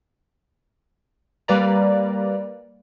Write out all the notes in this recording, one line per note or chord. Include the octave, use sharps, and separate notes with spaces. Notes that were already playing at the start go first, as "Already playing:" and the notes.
G3 A#3 B4 D5 A#5